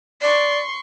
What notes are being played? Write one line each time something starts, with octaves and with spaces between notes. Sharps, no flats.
D5 C6 C#6